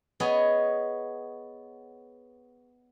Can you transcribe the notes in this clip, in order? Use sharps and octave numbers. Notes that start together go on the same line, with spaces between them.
B3 G#4 C#5 D#5